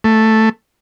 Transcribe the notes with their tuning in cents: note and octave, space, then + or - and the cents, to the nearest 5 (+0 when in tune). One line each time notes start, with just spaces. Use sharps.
A3 +0